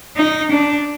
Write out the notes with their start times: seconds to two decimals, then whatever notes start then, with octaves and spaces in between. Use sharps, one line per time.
0.16 D#4
0.51 D4